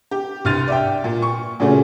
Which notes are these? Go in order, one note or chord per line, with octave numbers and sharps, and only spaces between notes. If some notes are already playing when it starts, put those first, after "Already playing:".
G4
C2 G2 C6 F6 A6 D#7
D5 E5 G5
A#2
C#6
A#2 C#3 A3 C#4 F#4 G#4